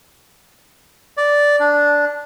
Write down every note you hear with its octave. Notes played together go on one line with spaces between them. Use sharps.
D5
D4